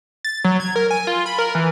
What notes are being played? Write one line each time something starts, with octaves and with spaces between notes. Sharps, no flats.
A6
F#3
G#6
A#4
G#5
F4
B5
A#4
E3